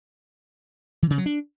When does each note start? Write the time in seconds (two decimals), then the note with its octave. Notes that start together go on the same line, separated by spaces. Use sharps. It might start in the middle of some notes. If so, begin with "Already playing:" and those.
1.03 E3
1.10 C#3
1.18 F#3
1.26 D4